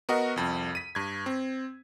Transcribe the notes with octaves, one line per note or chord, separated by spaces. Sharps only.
B3 F#4 A#4 D#5 F#5
C2 F2
B6 D#7
G2 G#6
C4